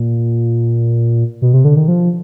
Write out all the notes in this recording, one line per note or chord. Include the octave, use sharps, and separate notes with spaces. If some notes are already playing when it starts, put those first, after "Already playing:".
Already playing: A#2
B2
C3
D3
D#3
F3